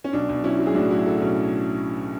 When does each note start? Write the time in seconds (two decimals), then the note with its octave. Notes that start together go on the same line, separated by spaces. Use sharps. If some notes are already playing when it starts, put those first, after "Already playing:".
0.04 C#4
0.13 B1 D4
0.29 B1
0.44 F#3 C#4 E4
0.59 F#3
0.66 G#4
0.74 A2 D4 F#4
0.90 F#3 E4 G#4
1.05 F#3 F#4 A4
1.22 B1 C#4